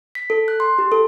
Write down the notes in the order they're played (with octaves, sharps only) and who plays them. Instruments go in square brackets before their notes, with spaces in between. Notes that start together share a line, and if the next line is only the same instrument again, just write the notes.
[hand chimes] B6
A4
F#6
C6
G4
A4